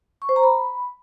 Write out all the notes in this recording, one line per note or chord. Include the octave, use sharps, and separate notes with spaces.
C#6
C5
A#5
B5